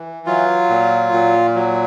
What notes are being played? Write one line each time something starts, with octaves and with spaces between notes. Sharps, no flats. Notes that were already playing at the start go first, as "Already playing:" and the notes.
Already playing: E3
F#3 F4
A#2
A#2
F#3